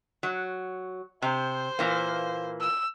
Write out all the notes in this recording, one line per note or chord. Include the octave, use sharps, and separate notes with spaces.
F#3
C3 C5
A#2 E3 A#3
E6